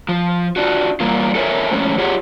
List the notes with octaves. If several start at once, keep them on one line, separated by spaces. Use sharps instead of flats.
F3
D4 F4 F#4
E2 G3 A#3 F4
A4 A#4 C5 C#5 E5 G#5
F2 A2 G#3 C#4
F4 G4 G#4 C#5 F#5